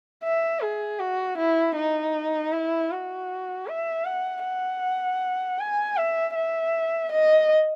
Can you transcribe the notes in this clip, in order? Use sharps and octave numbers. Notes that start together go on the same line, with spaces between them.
E5
G#4
F#4
E4
D#4
E4
F#4
E5
F#5
F#5
G#5
E5
E5
D#5